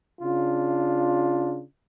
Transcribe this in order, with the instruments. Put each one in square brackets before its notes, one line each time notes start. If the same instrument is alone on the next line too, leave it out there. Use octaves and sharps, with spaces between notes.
[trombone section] C#3 D4 F4